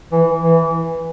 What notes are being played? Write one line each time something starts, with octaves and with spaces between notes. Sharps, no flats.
E3
E3